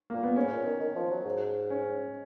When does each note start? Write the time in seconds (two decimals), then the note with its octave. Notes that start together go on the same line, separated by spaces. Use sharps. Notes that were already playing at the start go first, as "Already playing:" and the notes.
0.10 A#2 A#3
0.23 B3
0.36 G#2 C#4
0.52 A#2
0.66 D#3
0.80 D#3
0.95 F3
1.11 F#3
1.25 G#2
1.70 C#4